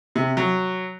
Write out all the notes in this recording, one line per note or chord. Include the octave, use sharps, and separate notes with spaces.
C3
F#3